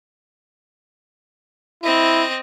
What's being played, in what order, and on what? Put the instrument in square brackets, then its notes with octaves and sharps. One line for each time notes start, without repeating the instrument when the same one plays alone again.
[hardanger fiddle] C4 D#5 [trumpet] E4